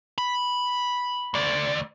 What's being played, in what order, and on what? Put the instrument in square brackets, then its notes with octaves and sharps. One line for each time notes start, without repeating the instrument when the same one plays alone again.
[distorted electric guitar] B5
[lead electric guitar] D2 D5